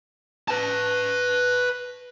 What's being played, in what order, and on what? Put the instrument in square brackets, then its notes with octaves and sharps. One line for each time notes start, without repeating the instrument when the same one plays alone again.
[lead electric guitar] B4 A5